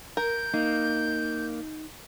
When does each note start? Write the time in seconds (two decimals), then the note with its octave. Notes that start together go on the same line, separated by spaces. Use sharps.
0.17 A#4 G6
0.54 A#3 D#4